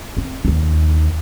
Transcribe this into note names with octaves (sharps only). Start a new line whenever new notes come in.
C4
D#2 D#4